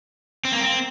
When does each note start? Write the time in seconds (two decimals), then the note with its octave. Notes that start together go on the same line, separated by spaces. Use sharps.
0.45 C4
0.52 A#3
0.61 C4